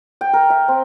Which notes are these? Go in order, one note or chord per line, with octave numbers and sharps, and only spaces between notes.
G5
A#4
E5
C4